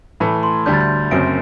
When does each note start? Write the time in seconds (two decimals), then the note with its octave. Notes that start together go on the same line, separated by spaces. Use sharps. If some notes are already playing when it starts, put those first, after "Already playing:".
0.20 A2 E3 A3 B5
0.43 C6
0.66 D2 D3 G3 D4 G6
0.74 A6
0.81 G6
1.11 F#1 F#2 F#3 C4 D7